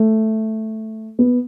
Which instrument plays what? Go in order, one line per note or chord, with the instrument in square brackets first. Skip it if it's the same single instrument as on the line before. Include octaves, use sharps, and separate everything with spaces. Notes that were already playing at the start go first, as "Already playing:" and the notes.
Already playing: [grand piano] A3
B3